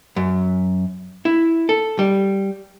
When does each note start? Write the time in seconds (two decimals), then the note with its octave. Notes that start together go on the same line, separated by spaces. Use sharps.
0.16 F#2
1.25 E4
1.69 A4
1.99 G3